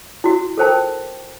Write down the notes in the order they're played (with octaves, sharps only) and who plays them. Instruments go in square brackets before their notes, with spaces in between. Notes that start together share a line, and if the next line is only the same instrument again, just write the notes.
[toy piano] E4 F#4
A4 A#4 C5 G5 A5